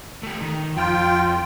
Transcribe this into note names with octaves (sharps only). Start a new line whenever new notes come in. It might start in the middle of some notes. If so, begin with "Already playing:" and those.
A3 G4
D#3
F2 F4 G5